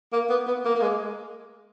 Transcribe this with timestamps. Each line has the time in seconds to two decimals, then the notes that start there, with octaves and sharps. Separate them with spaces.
0.13 A#3
0.30 B3
0.47 B3
0.65 A#3
0.75 A#3
0.82 G#3